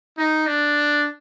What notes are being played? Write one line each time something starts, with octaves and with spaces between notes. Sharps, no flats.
D#4
D4